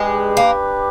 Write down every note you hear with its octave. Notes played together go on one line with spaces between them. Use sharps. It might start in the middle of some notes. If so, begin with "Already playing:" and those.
Already playing: G#3 D4 G4 B4
A#3